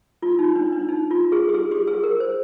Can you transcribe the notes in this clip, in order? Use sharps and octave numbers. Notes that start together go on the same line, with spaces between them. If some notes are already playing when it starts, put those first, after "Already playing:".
F4
D#4
D4
D4
D#4
F4
G#4
G4
G#4
G4
G#4
A#4
C5